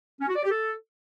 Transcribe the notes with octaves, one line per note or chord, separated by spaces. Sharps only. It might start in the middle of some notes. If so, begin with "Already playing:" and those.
C#4
F#4
D5
G4
A4